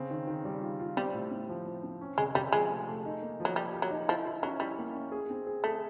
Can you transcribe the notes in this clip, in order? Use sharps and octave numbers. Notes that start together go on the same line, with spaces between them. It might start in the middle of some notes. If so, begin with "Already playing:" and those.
Already playing: C#3 C4
D#3
D#3
G3
F4
F4
G3 C4
A2
C4
F3
F3
C4
C#4
C3 G#3
C3 G3
F3 G#3
A3
A3
D#4
A#3
F3
F#3
G3 G4
G4
F#3
D#4
F3 E4
E4
F#3 C#4
G3 E4
A#3
C#4
G#4
C4
G#4
A3 G#4